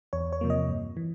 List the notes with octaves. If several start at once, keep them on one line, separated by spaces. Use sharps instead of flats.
E2 C#5
C#5
C3 F3 A#3
D#5
G2
E3